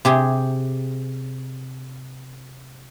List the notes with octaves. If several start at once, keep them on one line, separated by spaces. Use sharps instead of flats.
C3 G4 G#4